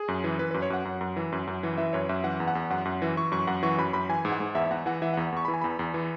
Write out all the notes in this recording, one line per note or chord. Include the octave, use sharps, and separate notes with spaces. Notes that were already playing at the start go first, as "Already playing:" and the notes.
Already playing: G#4
F#2
E3
E3 B4
F#2 B4
C#5
F#2 F#5
F#2
F#2
E3
F#2
F#2
E3
E3 E5
F#2 C#5
F#2 E5
E3 F#5
E2
F#5
E2
F#2 F#5
F#2
E3
E3 C#6
F#2 C#6
F#2 F#5
E3 C#6
F#2 B5
F#2 B5
E3 G#5
G#2
F#5
G#2
E2 E5
E2 F#5
E3 F#5
E3 E5
E2 F#5
E2 C#6
E3 B5
G#5
E2 B5
E2
E3